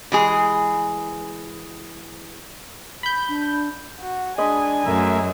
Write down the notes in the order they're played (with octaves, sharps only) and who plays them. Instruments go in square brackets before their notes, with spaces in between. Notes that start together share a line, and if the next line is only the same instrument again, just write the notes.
[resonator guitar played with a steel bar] E3 G#3 G#4
[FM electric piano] B5 G6
[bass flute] D4
[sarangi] F#4
[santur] G#3 D#5 B5 [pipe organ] D4 [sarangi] G#5
[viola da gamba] F#2 [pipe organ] A3 A#4 E5